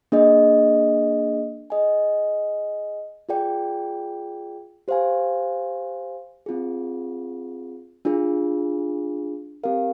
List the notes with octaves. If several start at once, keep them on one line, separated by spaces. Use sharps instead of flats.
A#3 D4 G#4 D#5
G#4 D#5 G#5
F4 G#4 D5 G5
G4 C5 F5 G#5
C4 F4 G#4
D4 F4 G#4
C4 G4 A#4 F5